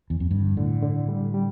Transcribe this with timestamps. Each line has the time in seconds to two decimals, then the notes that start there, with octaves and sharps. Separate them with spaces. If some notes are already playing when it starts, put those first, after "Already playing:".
0.10 E2
0.20 F2
0.31 G2 D3
0.57 A2 D3
0.83 D3
1.09 G3
1.34 G3